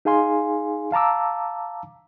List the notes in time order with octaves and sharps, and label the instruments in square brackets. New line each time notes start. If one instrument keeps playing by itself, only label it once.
[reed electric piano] D#4 G#4 F5 G#5 C6
F5 A5 A#5 D6 E6